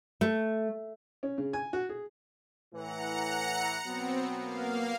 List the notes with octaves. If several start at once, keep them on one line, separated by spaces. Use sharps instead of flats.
A3
C#4
C#3
G#5
F#4
G#4
A2 E3 F#5 A#5 C#7
B2 F#3 B3 C4
A#3 F5